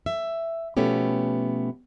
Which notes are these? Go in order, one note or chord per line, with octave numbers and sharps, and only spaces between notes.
E5
B2 F3 A3 B3 C#4 G4